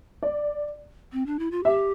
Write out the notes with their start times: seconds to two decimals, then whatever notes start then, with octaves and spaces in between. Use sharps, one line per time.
0.23 D5
1.13 C4
1.26 D4
1.39 E4
1.51 F4
1.64 G4 E5